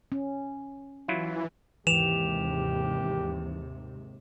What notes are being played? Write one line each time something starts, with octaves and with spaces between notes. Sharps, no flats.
C#4
E3 F#3 E4 F4
D#2 G#2 C3 E3 G4 E7 F7